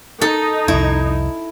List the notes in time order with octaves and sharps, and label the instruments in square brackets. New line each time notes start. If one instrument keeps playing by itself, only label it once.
[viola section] D#4 [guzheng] A4
[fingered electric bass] C2 F2 [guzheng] E4